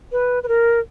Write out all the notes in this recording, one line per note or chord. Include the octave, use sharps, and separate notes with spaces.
B4
B4
A#4